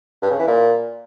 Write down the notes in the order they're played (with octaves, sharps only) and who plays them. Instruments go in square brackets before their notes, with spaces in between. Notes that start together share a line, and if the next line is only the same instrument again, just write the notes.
[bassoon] G2
C#3
E3
A#2